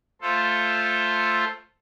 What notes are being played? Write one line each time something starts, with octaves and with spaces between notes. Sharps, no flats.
A3 F4 A4 C5